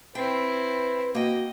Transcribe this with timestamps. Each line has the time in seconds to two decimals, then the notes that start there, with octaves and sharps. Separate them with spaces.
0.15 C4 E4 B4 G5
1.15 A#3 F#4 D#5 G5